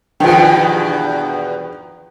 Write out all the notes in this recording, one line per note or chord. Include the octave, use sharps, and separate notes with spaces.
E2 G2 B2 D#3 F3